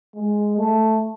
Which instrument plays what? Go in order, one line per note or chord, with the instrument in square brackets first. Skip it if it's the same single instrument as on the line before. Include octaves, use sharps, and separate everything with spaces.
[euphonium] G#3
A3